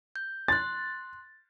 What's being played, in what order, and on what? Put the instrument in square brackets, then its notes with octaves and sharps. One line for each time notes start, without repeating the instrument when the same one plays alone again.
[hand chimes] G6
[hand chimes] C6 F#6 [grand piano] A6